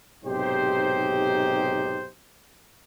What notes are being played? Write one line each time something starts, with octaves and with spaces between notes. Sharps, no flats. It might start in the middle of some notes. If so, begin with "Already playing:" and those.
B1 G#2 C3 D#4 G4 C5